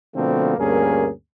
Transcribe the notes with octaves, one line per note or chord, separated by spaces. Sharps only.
B2 D3 F3 A3 A#3 C4
D2 G2 A#3 C#4 G#4 A#4